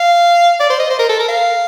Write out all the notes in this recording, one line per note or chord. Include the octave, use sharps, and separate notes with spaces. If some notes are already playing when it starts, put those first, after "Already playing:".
Already playing: F5
D5
C5
D#5
C5
A#4
A4
A#4
F5